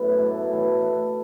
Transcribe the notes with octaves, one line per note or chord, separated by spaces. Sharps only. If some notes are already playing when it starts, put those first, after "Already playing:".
Already playing: F#2 A2 B3 F#4 A4
E4
B2 F#3 A3 D4
A2 E3 A3
E4
B2 A3 D4